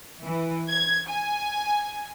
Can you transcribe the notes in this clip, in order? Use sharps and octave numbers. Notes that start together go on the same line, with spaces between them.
E3
G#6
G#5